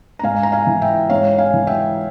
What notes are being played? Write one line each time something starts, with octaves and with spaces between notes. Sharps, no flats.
A#5
G#2 F5 G#5
A#5
F5 G#5
E3
E5 G5
G#2 C#5 F5
F5 G#5
E3
E5 G5